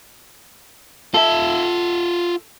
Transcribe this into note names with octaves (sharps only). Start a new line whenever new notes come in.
F4 A4 E5